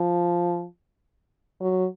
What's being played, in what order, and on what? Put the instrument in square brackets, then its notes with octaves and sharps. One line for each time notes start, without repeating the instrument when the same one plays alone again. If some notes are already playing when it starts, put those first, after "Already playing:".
Already playing: [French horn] F3
F#3